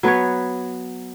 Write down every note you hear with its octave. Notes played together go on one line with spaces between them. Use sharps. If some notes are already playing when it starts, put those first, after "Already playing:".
F#3 B3 B4 C#5